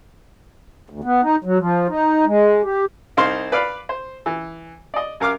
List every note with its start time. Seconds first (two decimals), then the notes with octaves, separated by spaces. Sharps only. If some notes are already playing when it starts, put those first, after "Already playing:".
0.90 D2
1.04 B3
1.23 D#4
1.44 F#3
1.59 F3
1.89 D#4
2.26 G#3
2.64 G4
3.17 C2 D#4 C5 F5 C6
3.52 B4 D5 F5 B5
3.89 C5
4.26 E3
4.94 D5 D#5
5.20 F#2 A#4 F5 D6 F6